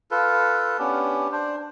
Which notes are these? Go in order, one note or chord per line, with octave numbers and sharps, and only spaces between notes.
F4 A4 B4
B3 C#4 D4 G4
D4 C5